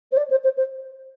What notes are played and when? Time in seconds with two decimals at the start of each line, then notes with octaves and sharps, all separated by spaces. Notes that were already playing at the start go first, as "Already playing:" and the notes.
0.11 C5
0.16 D5
0.30 C5
0.43 C5
0.56 C5